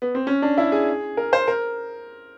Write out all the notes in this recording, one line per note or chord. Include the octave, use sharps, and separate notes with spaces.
B3
C4
C#4
D4
E4
G#4
A#4
C5
A#4